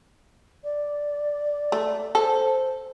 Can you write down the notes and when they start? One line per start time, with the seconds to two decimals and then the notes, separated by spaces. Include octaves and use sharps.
0.64 D5
1.72 A3
2.15 A4 C5